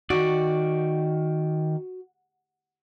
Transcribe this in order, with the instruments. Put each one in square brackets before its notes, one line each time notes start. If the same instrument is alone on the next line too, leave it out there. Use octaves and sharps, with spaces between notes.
[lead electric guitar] D#3 D5 [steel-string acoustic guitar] F#4